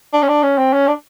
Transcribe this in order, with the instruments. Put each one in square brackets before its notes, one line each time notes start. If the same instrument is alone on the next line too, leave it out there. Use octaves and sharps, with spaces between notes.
[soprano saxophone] D4
C#4
D4
C#4
C4
C#4
D4